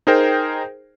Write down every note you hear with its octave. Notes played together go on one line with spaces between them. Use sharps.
D#4 G#4 A#4 C5 G5